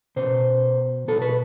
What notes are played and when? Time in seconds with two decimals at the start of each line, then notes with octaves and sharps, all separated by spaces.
0.16 B2 C5
1.08 B2 A4
1.22 B4